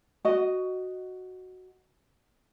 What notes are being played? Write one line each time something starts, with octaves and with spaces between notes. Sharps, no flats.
F#4 D#5